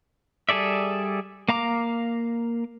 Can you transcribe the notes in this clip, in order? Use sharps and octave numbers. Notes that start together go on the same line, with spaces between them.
G3 G#4 A4 D5 E5
A#3 F5 A#5 D6